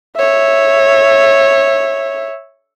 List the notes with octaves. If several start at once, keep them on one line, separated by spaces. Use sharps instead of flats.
C#5 E5